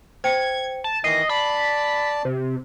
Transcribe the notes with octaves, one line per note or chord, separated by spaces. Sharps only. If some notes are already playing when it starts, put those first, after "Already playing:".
C5 G5 G#6 C#7
A5
D#3 E3 D#5 C7
D5 A5 B5
C3